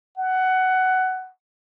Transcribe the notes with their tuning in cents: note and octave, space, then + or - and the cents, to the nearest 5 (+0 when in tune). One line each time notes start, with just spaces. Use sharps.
F#5 +15